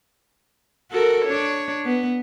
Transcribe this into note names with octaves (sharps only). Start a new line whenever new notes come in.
F#4 A4 A#4
D4 C#5
B3